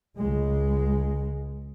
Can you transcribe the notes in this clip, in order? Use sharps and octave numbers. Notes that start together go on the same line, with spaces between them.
C#2 G#3